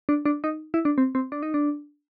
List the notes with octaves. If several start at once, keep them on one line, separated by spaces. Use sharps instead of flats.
D4
D4
D#4
E4
D4
C4
C4
D4
D#4
D4